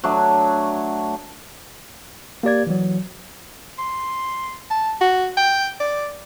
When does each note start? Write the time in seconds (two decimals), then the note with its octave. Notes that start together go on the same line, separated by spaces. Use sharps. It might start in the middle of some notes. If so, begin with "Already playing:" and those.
0.04 F#3 A3 D4
2.43 A#3 G4 D5 G#6
2.67 E3 F#3
3.79 C6
4.71 A5
5.01 F#4
5.37 G5
5.80 D5